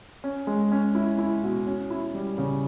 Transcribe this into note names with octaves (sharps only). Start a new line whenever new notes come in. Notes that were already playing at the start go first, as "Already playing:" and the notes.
C#4
G#3
C#4
E4
E4
B2
C#4
E4
G3
C#3